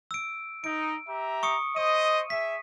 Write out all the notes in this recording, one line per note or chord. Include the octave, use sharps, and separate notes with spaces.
E6 D7
D#4 D7
G4 E5 A#5
C#6 D#6 C#7
C5 D#5 D#7
G#4 E5 B6